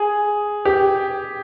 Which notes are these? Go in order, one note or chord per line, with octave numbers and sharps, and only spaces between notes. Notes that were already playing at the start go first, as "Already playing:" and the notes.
Already playing: G#4
G4